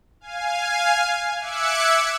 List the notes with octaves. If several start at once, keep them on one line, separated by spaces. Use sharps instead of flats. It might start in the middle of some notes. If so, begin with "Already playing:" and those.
F5 G#5
E5 D6 E6 F#6 G#6 C#7